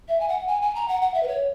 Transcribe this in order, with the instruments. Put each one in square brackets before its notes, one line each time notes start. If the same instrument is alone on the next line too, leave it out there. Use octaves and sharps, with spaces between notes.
[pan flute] E5
G#5
F#5
G#5
G#5
A#5
F#5
F#5
E5
B4
C#5